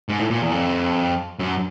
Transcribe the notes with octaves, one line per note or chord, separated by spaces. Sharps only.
G#2
A2
A#2
E2
F2
F#2